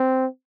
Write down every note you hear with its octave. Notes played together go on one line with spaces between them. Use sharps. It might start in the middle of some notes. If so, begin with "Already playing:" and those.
Already playing: C4